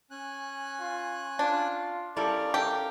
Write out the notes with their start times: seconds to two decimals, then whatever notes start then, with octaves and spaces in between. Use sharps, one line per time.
0.11 C#4 G#5 F#6
0.80 F4
1.39 D4 F4
2.16 G3 C#4 E4 A4 A#4 D5 F5
2.54 G4 A4